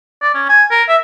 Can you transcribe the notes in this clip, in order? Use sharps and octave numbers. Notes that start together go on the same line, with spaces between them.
D5
C#4
G#5
A#4
E5